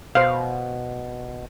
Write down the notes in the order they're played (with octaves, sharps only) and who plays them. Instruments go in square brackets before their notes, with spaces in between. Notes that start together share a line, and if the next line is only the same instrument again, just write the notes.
[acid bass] B2 [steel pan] C5 F5